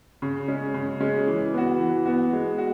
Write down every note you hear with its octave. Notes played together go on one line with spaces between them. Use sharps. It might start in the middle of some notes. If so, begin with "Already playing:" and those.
C#3
G#3 C#4
C#3
G#3 C#4
E3
B3 F#4
E3
B3 F#4
G#3
F#4